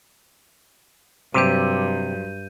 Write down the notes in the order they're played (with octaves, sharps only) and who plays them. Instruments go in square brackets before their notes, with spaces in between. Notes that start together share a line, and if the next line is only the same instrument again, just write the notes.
[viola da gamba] G2 [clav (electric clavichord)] C3 G4 [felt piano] F#3 C5 [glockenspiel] G6 D#7